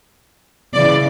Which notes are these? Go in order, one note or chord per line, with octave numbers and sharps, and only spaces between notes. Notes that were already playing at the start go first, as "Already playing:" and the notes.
C#3 E3 D5